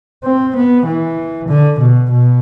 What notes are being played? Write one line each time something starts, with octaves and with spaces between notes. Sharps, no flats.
C4
B3
E3
D3
B2
B2